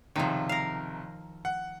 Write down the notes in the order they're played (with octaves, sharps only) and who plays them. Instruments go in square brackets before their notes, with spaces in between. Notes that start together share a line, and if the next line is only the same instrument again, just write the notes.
[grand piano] F#1 C3 [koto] D#3 F3
[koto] A#4 F5
[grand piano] F#5